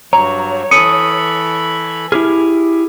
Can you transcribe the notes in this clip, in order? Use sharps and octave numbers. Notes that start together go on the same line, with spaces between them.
G2 F#3 C#5 A#5
E3 A4 B5 D#6 C#7 D#7
E4 G4 G#4 F6